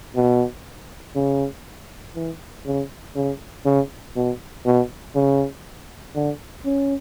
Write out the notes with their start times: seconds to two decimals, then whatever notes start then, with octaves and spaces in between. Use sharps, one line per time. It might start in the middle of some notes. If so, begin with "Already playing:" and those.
0.15 B2
1.16 C#3
2.15 E3
2.66 C#3
3.16 C#3
3.65 C#3
4.16 B2
4.66 B2
5.15 C#3
6.15 D3
6.65 C#4